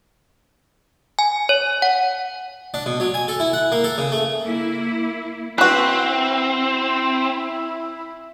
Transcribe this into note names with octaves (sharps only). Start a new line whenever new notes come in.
G#5
C#5
F#5
D4
B2
F#3
G#5
A4
E4
F#5
A#3
A4
C#3
A3
A#3 E4
C4 E4 F#4 B4